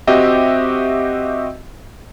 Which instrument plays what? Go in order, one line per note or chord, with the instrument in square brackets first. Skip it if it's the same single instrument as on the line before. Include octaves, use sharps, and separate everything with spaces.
[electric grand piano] C4 F#4 G4 D#5 E5